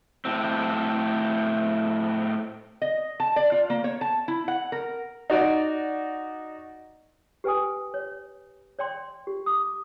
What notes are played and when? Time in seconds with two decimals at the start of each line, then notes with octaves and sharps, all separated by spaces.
0.25 A2 C4
2.82 D#5
3.20 A5
3.36 D5
3.52 F4
3.70 A#3
3.84 C#5
4.01 A5
4.28 E4
4.48 F#5
4.72 A#4
5.30 D#4 F#4 D5
7.44 G4 B4 G5 G#5 D#6
7.94 C#5
8.79 C#5 D5 G5 C6
9.27 G4
9.46 D6 D#6